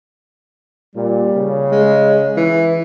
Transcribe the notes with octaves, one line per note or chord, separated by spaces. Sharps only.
A#2 G3
C#3
G#3
E3